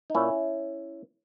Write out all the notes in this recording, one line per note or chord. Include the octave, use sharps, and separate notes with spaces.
D#4
A#2 C#4 E4